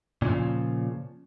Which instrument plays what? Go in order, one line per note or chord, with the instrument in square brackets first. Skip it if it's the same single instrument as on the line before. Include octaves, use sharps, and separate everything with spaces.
[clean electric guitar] A#2 C#3 E3 F3